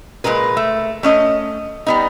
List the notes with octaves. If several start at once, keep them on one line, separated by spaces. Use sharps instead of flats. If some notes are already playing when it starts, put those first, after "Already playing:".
A#2 F3 G#3 A#4 B4
A3
A3 C#4 D#5
G3 B3 D#4